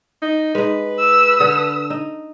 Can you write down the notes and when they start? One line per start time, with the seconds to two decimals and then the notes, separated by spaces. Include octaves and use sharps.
0.22 D#4
0.55 G#3 D#4 B4
0.99 E6
1.40 D3 A4
1.90 D#4